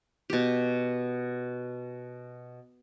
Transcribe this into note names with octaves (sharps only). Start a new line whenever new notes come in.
B2 G4